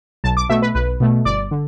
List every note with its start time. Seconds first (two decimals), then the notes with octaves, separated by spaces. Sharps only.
0.24 B1 A5
0.37 D6
0.49 B2 A3 E5
0.62 B4
0.75 B1 B4
1.00 B2 A3
1.25 G1 D5
1.51 D3